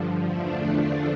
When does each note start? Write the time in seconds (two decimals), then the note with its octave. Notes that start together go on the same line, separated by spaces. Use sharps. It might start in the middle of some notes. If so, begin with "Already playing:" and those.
Already playing: G2 D3 F3
0.24 E2 D3 F3 A3 D4